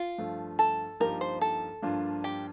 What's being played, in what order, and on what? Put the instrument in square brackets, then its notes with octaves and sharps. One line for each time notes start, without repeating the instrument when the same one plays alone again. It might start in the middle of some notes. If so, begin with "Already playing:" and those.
Already playing: [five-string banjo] F4
[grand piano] G2 F3 A3
[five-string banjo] A4
[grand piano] G2 F3 A#3 D#4 G4 [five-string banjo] A#4
[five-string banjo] C5
A4
[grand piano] G2 F3 A#3 D4 F4
[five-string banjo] G4